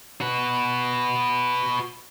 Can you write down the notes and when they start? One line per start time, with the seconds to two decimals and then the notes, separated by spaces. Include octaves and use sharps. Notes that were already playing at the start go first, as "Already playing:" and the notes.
0.21 F#4 B4